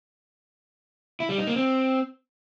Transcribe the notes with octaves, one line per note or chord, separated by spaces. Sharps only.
E4
G3
D#4
A#3
C4